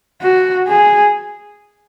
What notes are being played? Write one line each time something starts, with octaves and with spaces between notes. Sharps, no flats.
F#4
G#4